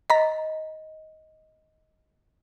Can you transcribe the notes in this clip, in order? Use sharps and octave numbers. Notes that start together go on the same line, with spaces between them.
D#5 A#5 B6